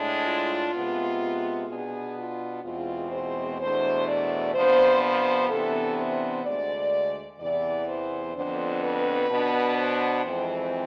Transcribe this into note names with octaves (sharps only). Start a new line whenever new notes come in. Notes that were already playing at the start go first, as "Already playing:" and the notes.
Already playing: A2 G#3 D4
F4
C3 G#3 B3
B2 B3 D4 G#4
F4
E2 B2 G#3 C4 F4
C5
E2 B2 A3 D4 C5
D5
C3 F3 B3 D4 C5
C5
C3 E3 B3 D4 A4
C5
D2 D3 G#3 D5
E2 C3 E3 B3 D5
C5
F2 D3 F3 B3 D4 C5
B4
B2 B3 D4
C5
F2 E3 G#3 C4